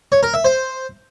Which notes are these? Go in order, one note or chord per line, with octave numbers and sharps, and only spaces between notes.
C#5
A#4
E5
C5